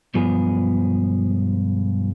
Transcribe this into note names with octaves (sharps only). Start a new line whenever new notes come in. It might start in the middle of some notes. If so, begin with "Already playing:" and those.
B1 G2 F3 B3 G#4